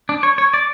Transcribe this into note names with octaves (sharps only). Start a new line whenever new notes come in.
D4
C#5
C#5
D5